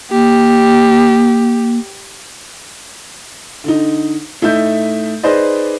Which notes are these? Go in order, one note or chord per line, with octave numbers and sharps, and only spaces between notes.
A#3 G4
D3 D#4
A2 A3 D#4 E4 E5 G6
D#4 G#4 B4 C5 D5 D#5